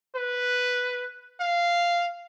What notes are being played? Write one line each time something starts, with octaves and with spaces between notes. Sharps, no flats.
B4
F5